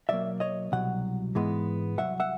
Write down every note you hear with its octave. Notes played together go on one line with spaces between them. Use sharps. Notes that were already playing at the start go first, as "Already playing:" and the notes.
B1 A2 F#3 A#3 D5 E5
C#5 D#5
C2 B2 F#3 F#5
G#2 E3 G#3 B3
C2 B2 F#3 E5 F#5
E5 F#5